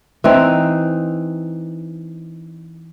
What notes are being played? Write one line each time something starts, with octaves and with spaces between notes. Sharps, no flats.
E3 C4 D#4